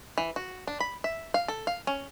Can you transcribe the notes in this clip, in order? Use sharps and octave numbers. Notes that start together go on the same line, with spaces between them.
E3
F#4
D4
B5
E5
F5
A4
F5
C#4